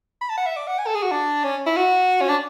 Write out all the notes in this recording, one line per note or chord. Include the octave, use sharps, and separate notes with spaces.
B5
A5
F#5
E5
D5
F#5
G#5
A4
G#4
F#4
D4
C#4
E4
F#4
C#4
D4